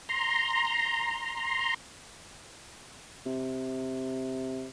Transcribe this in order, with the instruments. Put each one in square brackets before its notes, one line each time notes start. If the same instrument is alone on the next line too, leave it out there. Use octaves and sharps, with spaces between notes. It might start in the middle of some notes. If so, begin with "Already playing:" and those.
[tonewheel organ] A#5 C6
[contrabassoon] C3